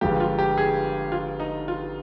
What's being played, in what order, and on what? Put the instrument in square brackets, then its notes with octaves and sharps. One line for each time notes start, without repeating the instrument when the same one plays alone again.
[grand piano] G1 G2 F3 G#3 [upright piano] G4
[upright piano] F4
G4
G#4
F4
D#4
F4